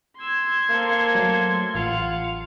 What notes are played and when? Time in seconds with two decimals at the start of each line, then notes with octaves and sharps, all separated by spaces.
0.19 C6 E6 G#6
0.69 A#3 C4 A4
1.15 F#3 A3
1.75 A1 F4 F5 F#5